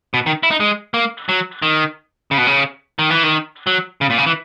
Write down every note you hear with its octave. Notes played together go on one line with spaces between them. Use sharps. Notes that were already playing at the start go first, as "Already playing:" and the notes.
B2
D#3
E4
D#4
G#3
A#3
F#3
D#3
C#3
B2
C#3
D#3
E3
D#3
F#3
C#3
A#2
C#3
E3